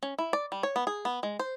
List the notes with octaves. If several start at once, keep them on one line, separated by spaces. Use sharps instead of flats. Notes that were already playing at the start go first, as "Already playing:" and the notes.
C#4
E4
D5
G3
C#5
B3
G#4
B3
G#3
C5